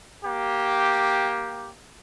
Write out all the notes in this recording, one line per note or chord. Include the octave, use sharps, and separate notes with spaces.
A#3 G4